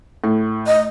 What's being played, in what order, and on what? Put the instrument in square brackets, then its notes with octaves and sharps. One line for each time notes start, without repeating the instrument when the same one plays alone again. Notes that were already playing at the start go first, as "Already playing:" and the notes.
[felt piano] A2
[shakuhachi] D#5